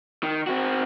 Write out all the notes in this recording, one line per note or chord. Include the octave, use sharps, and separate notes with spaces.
D#3
C4 F#4